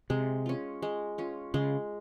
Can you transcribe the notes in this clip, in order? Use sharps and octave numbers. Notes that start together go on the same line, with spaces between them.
C3 G#3
C#4 F4
G#3
C#4 F4
C#3 G#3